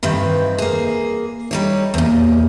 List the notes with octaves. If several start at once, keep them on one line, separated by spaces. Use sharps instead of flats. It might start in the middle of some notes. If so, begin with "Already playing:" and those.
G2 C3 D#3 E3 B4
A#3 G#4
G3 D#4 C#5
E2 A#2